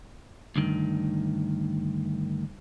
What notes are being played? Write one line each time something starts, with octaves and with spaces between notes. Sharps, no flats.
D2 G2 D#3